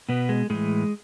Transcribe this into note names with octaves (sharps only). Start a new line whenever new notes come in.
B2 B3
G#3
A2 E3 G#3